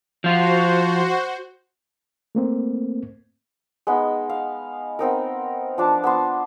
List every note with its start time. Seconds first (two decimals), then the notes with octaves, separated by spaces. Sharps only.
0.24 F3 F4 F#4 C5
2.35 A3 A#3 C4
3.87 G#3 B3 D#4
4.29 F5
4.99 B3 C4 D#4 A#4
5.78 F3 D4 A5
6.04 B3 A5 C6